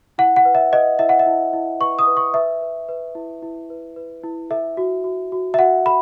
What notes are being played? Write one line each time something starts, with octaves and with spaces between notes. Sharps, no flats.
E4 F#5
F#5
B4
E5
B4 D#5
E4 E5
F#5
E5
E4
E4
B4 C#6
D#6
B4
C#6
B4 E5
B4
B4
E4
E4
B4
B4
E4
A4 E5
F#4
F#4
F#4
E5
F#4 F#5
A4 B5